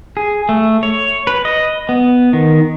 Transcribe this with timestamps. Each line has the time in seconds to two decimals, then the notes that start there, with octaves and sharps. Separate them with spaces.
0.17 G#4
0.49 A3
0.83 C#5
1.27 B4
1.45 D#5
1.89 B3
2.33 D#3